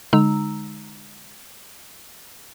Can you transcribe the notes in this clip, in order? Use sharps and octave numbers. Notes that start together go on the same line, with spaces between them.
D3 G#3 D#4 A#5 E6